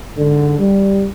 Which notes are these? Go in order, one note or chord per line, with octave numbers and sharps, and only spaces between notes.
G#2 D3
G3